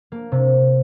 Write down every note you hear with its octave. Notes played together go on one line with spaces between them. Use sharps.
A#3
C3